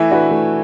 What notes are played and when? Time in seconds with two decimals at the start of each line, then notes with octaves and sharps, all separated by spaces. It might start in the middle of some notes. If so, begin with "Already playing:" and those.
Already playing: E3 A3 E4
0.11 D4 F#4 B4
0.31 A3